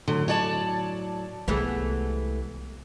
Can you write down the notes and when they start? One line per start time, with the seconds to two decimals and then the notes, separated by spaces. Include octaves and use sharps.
0.08 A2 D3 F#3
0.28 C#5 D5 A5
1.48 C2 E3 G#3 A3 B3 G4 G#4